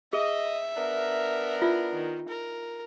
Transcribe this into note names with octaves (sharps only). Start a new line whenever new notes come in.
G#4 D#5 E5
B3 D4 A#4
E4 F4
D#3
A#4